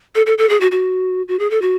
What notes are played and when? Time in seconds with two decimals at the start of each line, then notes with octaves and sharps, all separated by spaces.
0.15 A4
0.26 A4
0.38 A4
0.49 G#4
0.60 F#4
0.71 F#4
1.28 F#4
1.39 G#4
1.51 A4
1.62 F#4